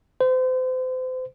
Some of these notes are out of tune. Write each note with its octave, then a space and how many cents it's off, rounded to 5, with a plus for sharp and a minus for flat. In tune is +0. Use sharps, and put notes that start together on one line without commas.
C5 -35